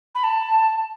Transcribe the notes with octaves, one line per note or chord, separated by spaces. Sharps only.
B5
A5